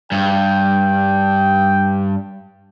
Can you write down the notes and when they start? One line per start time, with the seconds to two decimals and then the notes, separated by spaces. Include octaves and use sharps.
0.12 G2 G5